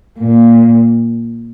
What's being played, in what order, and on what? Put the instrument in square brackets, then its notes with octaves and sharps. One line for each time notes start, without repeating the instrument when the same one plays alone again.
[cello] A#2